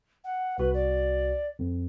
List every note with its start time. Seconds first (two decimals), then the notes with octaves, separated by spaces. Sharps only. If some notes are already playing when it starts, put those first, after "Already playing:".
0.24 F#5
0.58 C2 F#4 B4
0.74 D5
1.59 F2